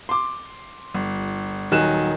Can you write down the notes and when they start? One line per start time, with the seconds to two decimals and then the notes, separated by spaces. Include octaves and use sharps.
0.09 C6 D6
0.94 G1
1.72 D#1 D#3 F#3 G#5 F#6 E7